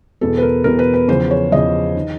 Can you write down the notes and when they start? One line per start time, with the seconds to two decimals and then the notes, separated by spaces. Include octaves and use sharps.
0.21 E2 B2 A4
0.38 B4
0.42 A#4
0.64 E2 B2 A#4
0.79 B4
0.94 B4
1.08 E2 C#3 F3 C5
1.31 C#5
1.52 E2 C#3 F3 D#5
1.96 D#3